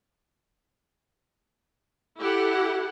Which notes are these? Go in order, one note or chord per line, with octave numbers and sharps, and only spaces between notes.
E4 G4 A4 F#5